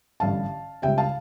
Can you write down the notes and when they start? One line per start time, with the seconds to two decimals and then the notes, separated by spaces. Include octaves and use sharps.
0.20 A1 G2 D3 F5 A5
0.82 C#2 C#3 G3 E5 G5
0.98 F5 A5